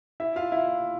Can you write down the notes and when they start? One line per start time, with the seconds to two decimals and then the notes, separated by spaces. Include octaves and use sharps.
0.20 E4 E5
0.36 F4 F5
0.52 E4 E5